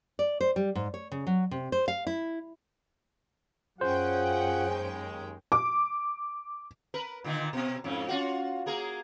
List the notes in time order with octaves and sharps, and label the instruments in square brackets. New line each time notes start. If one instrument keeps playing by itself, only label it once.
[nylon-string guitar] D5
C5
G3
G#2
C#5
C#3
F#3
C3
C5
F5
E4
[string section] F#2 C#4 G5 [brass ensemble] F4 F#5 [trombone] G#4 [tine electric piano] C5
[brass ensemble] D#2 G#3
[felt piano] D6
[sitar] A#4 B4
A#2 D3 D#3
B2 C4
F2 G#2 C#4
C#4 F4 F#4
A#3 G#4 A#4